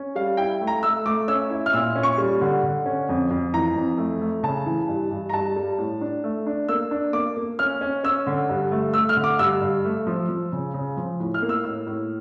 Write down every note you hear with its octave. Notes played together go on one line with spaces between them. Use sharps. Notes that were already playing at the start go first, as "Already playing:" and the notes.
Already playing: C#4
G3 F5
E4 G5
A3
A#5
A3 E6
A3 D6
C#4 E6
E4
F6
A#2 E6
C#4
C#6
G3
D3
D3
C#4
F2
F2
E3 A#5
F2
A3
A3
C#3 A5
E3
G2
G2
A#5
G2 A5
G3
A2
D4
A3
D4
A#3 E6
D4
A#3 D6
A#3
C#4 F6
C#4
C#4 E6
D3
G2
A3
A3 E6
F6
D3
D6
G2 E6
G2
A3
F3
F3
C#3
C#3
F3
A2
F6
A#3
E6
A2 E6
A2